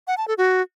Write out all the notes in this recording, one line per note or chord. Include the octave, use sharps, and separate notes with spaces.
F#5
A5
A4
F#4